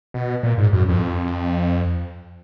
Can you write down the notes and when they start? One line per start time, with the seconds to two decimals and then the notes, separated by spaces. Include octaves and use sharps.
0.14 B2
0.43 A#2
0.58 G#2
0.73 F#2
0.88 F2